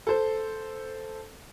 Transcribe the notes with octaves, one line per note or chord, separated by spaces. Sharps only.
A4 C5